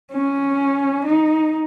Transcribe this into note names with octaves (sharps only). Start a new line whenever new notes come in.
C#4
D#4